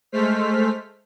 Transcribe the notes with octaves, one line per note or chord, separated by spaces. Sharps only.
G#3 A3 C5 F6 B6